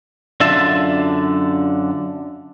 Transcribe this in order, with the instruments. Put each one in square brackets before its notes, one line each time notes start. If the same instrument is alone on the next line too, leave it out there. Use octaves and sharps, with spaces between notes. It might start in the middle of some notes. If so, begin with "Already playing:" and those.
[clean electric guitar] F#2 D3 D4 F4 E5 A5